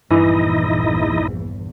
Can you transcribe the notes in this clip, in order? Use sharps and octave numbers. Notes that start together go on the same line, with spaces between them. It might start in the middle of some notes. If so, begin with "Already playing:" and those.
A#1 E2 G2 E3 D#4 E4 D#5